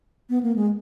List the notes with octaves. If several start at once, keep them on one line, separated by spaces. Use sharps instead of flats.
B3
A#3
G#3